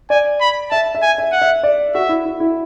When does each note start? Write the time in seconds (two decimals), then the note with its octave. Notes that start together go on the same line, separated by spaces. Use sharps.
0.10 D5 G#5
0.41 B5
0.71 E5 A5
0.95 E5
1.02 G#5
1.18 E5
1.33 F#5
1.42 E5
1.63 D5
1.94 F#4 E5
2.09 E4
2.25 E4
2.40 E4